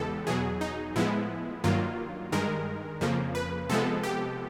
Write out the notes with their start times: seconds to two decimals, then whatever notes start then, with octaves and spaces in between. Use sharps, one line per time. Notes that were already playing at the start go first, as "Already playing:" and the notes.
Already playing: E2 C#3 E3 G#3 B3 G4 A4
0.27 E2 B2 F#3 G#4
0.61 D#4
0.96 A2 F3 G#3 B3 E4
1.64 G2 D#3 F#3 A#3 F4
2.32 G2 D#3 G#3 A#4
3.01 F2 C#3 F3 A#3
3.35 B4
3.69 C3 F3 G#3 B3 A4
4.03 G4